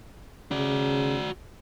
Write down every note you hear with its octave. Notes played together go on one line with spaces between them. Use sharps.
C#3 F#4 D5